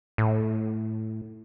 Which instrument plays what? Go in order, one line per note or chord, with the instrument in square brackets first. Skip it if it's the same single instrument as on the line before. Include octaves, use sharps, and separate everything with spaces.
[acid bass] A2